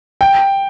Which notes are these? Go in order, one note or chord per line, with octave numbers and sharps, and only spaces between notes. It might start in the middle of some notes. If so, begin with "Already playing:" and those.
G5